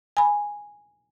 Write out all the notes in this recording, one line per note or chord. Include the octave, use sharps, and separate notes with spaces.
G#5 B5